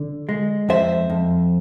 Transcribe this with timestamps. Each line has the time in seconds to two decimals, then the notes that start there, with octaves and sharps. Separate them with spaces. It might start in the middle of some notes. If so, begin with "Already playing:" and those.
Already playing: D3
0.29 G#3
0.69 F2 C5 E5
1.10 F2